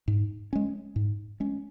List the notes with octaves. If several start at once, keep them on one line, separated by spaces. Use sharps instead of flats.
G#2
G#3 C#4
G#2
G#3 C#4